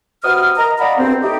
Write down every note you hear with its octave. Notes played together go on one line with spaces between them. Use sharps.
C3 F#4 B4 D#6 F6
A#4 D#5 A#5
D5 D#5 F5 F#5 A#5 B5
D2 G2 C4
A3 D#4 E4 G4